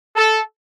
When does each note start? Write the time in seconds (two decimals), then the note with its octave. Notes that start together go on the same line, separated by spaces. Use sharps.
0.16 A4